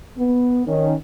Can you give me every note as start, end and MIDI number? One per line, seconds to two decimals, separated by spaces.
0.17 0.61 59
0.66 0.92 51
0.66 0.92 61